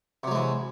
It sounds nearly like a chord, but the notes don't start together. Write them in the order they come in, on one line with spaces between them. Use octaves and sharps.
C3 F#3 G#3 E3